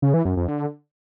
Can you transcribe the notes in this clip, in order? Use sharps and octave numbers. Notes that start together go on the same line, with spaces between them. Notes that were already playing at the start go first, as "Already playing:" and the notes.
C#3
E3
F#2
F2
D3